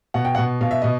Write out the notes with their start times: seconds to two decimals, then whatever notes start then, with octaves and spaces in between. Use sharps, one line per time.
0.14 B2 F#5
0.25 G5
0.35 F#5
0.38 B2
0.61 B2 F5
0.71 E5
0.82 B2 D#5